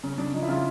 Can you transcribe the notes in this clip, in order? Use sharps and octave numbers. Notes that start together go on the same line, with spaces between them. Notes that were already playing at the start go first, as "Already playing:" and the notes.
C#3 C#4
C#3 D4
F3 D#4
E4
C#3 F4